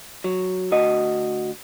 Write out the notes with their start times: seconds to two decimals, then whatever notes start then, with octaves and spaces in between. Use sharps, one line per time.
0.24 F#3
0.72 D2 F#4 D#5